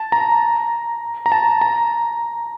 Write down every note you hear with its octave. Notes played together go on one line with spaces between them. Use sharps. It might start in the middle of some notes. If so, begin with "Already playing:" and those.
Already playing: A5
A#5
A#5
A5
A#5